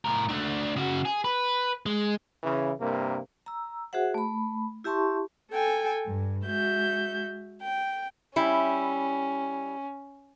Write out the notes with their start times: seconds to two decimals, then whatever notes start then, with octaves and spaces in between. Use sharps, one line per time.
0.05 A2 A#4
0.29 A3 D4
0.77 C#3 F#4
1.05 G#4
1.24 B4
1.86 G#3
2.43 C#3 E3
2.79 G2 C3 A#3
3.46 A#5 E6
3.93 F#4 G#4 C5 E5 F#5
4.14 A3 B5
4.84 E4 G4 E5 A5 C6 C#6
5.51 A4 G5 G#5
6.05 G2
6.46 G#3 F#4 E5 G6
7.62 G5
8.36 G3 C#4 E4